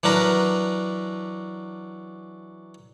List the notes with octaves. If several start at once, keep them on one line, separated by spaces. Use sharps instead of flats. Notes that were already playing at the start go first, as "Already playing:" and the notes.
E3 F#3 D4 A#4 B4